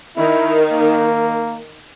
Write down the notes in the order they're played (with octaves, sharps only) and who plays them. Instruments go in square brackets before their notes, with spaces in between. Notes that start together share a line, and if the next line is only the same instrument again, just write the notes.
[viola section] D#3 [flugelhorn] E4
[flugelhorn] A#3